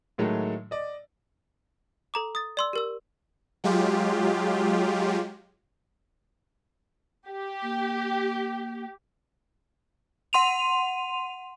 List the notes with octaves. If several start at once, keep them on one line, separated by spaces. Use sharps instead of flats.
A2 D#3 F#3 G#3 A3
D5 D#5
A4 A#5 D6
D#6 A6
D5 C6 E6
G4 A#4 E6
F#3 G#3 F4 G4
G4
A#3
F#5 C6 D#7 F7